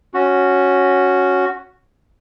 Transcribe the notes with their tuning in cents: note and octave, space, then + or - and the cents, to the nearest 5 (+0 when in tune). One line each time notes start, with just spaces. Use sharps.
C#4 +0 F#4 +0